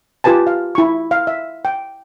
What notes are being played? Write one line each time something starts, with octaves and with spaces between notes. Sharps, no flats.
F4 G4 B4 G#5 A5
F5
E4 C#6
F5
E5
G5